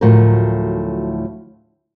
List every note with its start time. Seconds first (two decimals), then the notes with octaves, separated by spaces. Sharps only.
0.01 D2 A2 F3 F#3 A#4